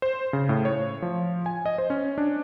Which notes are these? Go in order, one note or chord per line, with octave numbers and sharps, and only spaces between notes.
C5
C#3
A2
C#5
F3
G#5
D#5
C5
C#4
D4